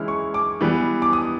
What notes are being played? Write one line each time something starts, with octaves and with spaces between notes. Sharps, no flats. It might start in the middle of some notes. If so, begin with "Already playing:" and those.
Already playing: E3 G#3 C#4 E4 F6
C#6
D6
E3 G3 B3
D6
D#6